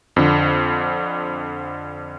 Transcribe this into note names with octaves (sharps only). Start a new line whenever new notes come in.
F2 D3